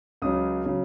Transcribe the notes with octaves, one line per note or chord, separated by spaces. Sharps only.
C#2 C#3 F#3 D#6
C#3 F#3